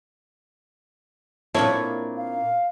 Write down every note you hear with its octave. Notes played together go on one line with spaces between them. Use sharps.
A#2 A#3 C4 D4 E4 A4 C#5
F5